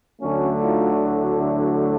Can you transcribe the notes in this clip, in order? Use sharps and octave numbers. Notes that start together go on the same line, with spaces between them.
D2 D3 F#3 A3 C#4
D#4 F4
D4 E4